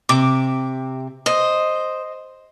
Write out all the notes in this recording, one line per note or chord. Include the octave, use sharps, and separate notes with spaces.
C3 D6
C5 D#5